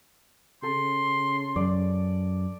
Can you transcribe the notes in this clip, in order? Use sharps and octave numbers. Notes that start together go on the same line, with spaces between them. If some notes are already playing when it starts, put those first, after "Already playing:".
C#3 A4 C6
F#2 D5